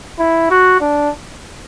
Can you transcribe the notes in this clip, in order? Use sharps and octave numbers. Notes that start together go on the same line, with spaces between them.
E4
F#4
D4